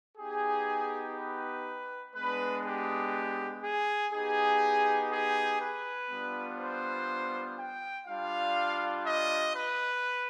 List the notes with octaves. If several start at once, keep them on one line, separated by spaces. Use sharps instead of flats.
B3 D#4 G4 G#4
B4
G#3 B3 D4 B4
G4
G#4
B3 D#4 G4 G#4
G#4
B4
G3 B3 D4 F4
C5
G5
G3 D4 F4 F5
D#5
B4